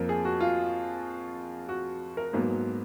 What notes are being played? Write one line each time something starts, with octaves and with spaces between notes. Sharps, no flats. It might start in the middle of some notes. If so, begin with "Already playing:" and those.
Already playing: F2 F3 A#3 A#4
G#4
F#4
F4
F#4
A#4
G#2 F#3 A#3 B3